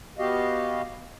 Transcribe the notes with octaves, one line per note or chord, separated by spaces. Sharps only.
B3 F#4 G4 D#5 F5